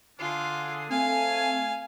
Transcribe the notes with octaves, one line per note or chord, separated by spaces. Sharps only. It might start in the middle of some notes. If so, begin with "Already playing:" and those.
D3 D4 F4 G#4 C7
A3 C4 F5 G#5